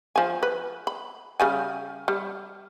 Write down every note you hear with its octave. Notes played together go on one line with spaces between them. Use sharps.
F3 G#5
B4
B5
C#3 G3 G#5
G3